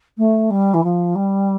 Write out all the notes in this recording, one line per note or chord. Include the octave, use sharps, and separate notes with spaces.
A3
G3
E3
F3
G3